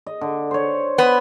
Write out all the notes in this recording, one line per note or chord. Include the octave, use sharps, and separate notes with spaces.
D#5
D3
C5 C#5
B3